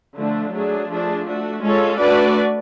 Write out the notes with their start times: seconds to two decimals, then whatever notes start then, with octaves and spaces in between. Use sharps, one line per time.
0.16 D3 F3 A3 D4
0.52 F#3 A3 D4 G#4
0.89 F3 A3 D4 G#4
1.26 A3 D4 F#4
1.62 G#3 C#4 F4 A4 C#5
1.98 A3 D4 F#4 B4 D5